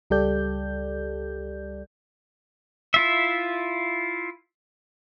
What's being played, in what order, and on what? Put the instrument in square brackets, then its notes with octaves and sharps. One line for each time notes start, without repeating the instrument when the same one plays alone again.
[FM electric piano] C#2 G3 G4 A4 D5 G6
[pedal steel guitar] E4 F4 E5